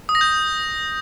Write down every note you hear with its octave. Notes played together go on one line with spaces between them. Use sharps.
D#6
A#6
G6